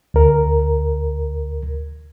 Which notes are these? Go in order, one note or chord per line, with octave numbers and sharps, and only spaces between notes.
D2 A#4